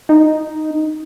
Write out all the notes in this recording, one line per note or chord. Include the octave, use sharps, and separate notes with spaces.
D#4